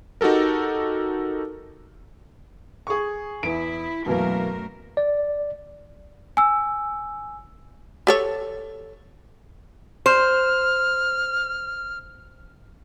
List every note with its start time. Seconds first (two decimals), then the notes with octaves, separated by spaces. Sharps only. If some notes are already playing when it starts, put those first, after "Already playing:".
0.21 D#4 F#4 G4 A4 A#4
2.87 G#4 C#6
3.43 E2 E4 D7
4.06 F#2 B2 E3 A3 A#3 A#4
4.97 D5
6.37 G#5 E6
8.07 G4 A4 C#5
10.06 C5 F6